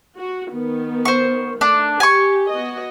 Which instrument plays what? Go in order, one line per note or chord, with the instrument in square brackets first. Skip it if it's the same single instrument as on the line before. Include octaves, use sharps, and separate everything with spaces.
[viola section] F#4
D#3 B3
[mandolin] C5 C#6
[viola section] A3 [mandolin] D4
[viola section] G4 [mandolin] G#5 C#6
[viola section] B3 F#4 D#5